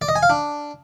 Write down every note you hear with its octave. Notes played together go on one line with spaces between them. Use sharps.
D5
D#5
G#5
F5
D4